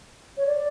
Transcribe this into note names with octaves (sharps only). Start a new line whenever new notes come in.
C#5
D5